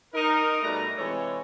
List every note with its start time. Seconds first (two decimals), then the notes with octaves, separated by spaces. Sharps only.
0.13 D#4 A#4
0.62 B2 G3 A3 B4 D5 A#5
0.97 C3 E3 G#3 A4 C#5